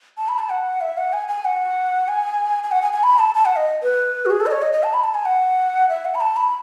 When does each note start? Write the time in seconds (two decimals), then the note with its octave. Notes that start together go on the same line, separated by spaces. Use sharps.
0.18 A5
0.29 B5
0.39 A5
0.50 F#5
0.81 E5
0.98 F#5
1.13 G#5
1.28 G#5
1.45 F#5
2.08 G#5
2.64 G#5
2.71 F#5
2.82 G#5
2.93 G#5
3.03 B5
3.19 A5
3.35 A5
3.45 F#5
3.56 D#5
3.83 B4
4.26 F#4
4.30 G#4
4.40 A4
4.46 D#5
4.52 C#5
4.62 D#5
4.73 D#5
4.83 A5
4.94 B5
5.04 A5
5.15 G#5
5.25 F#5
5.89 E5
6.05 F#5
6.15 B5
6.21 A5
6.36 B5